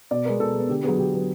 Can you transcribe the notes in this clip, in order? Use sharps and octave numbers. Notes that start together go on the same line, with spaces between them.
B2 D5
G#3 B3 A#4
B2 A4
G#3 B3
D3 G4
F#3 B3 G#4
D3 G4
F#3 B3